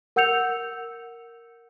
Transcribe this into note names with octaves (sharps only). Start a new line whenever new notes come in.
A#4 F#5 E6 G6 C#7 F7